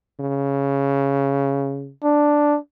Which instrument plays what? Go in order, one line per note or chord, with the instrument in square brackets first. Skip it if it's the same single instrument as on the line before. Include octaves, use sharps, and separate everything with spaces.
[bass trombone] C#3
[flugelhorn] D4